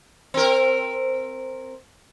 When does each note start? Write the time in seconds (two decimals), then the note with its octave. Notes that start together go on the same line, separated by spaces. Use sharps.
0.34 C4 A#4